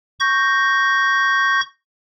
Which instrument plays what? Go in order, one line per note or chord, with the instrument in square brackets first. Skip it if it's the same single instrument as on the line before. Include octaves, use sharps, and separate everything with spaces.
[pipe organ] C#6 G6 A#6